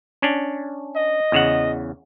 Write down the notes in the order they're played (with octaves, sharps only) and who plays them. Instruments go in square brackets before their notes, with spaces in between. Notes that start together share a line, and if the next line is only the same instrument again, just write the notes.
[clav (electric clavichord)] C#4 D4
[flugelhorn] D#5
[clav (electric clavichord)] E2 C#3 F#5